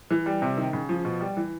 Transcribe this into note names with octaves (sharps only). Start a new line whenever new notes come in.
E3
G3
C3
D#3
C#3
F3
B2
G3
E3